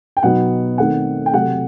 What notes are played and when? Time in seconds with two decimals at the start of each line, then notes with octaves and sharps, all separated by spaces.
0.17 G5
0.23 B2 F#3 B3 D#4 F#5
0.78 D#3 A3 C4 D#4 F#5
1.26 G5
1.33 C3 F#3 A3 F#5